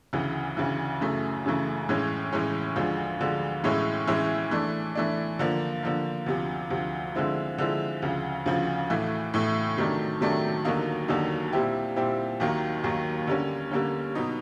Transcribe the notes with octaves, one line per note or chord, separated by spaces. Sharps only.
D2 C#3 E3
D2 C#3 E3
F#2 C#3 E3 A3
F#2 C#3 E3 A3
A2 E3 G#3 C#4
A2 E3 G#3 C#4
D2 D3 F3 G#3
D2 D3 F3 G#3
A2 E3 G#3 C#4 E4
A2 E3 G#3 C#4 E4
E3 A3 D4
E3 A3 D4
D3 F3 A#3
D3 F3 A#3
D2 C3 F3
D2 C3 F3
D3 F3 G#3 C4 E4
D3 F3 G#3 C4 E4
D2 C#3 F3
D2 C#3 F3
A2 E3 A3
A2 E3 A3
C3 D#3 F#3 A3 D4
C3 D#3 F#3 A3 D4
D#2 D3 F#3 A#3 D#4
D#2 D3 F#3 A#3 D#4
A#2 G3 C4 E4 G4
A#2 G3 C4 E4 G4
D#2 D#3 F#3 A#3
D#2 D#3 F#3 A#3
D3 G3 A#3 C#4
D3 G3 A#3 C#4
B2 F#3 B3 D#4